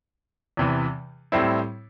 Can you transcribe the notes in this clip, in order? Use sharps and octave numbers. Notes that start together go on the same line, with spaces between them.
E2 C3 E3
A2 G3 C4 E4